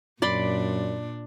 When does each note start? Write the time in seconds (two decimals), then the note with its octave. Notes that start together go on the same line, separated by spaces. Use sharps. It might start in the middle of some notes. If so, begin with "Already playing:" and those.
0.22 F#2 A#2 D4 D5 B5 C6